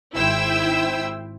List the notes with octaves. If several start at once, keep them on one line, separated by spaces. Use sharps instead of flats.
G#1 E4 C5 E5 G5 E6